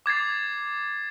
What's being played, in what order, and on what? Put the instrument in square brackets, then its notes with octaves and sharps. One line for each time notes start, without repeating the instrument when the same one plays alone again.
[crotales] D6 G#6 A6 C7